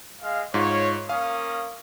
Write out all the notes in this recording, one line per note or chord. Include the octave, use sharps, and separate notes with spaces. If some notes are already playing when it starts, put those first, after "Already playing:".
G#3 F5
G#2 F4 C#5
A#3 C#4 F5 D#6